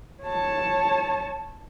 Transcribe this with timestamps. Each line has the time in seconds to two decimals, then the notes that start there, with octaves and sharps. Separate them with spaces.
0.23 C#5 A5